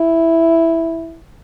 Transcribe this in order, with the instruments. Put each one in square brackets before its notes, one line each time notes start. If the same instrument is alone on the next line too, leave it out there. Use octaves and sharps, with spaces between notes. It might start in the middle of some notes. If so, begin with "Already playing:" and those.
Already playing: [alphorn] E4